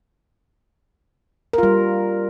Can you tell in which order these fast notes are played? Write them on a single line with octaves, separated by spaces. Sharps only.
A#4 F4 G3